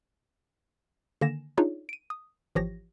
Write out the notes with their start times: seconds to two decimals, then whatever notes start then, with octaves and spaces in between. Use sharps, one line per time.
1.21 D3 D#3 A#3 G#5 A#6 E7
1.57 D4 D#4 F4 G#4 C#5 D5
1.89 D7 D#7
2.10 D#6
2.55 G#1 E3 F3 G4 C#5 A#6